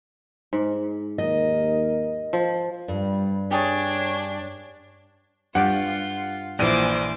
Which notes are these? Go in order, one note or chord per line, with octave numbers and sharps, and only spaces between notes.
G#2
D#2 A#4 D#5
F3
G2 G3
D4 G4 G#4 C#5 C#6
G2 F4 G4 D5 F#5
A#1 A#2 E3 E4 C5 D6 D#7